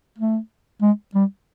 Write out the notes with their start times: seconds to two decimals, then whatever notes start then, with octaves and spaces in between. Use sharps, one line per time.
0.18 A3
0.82 G#3
1.15 G3